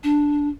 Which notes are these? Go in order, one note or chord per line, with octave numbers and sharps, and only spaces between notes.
D4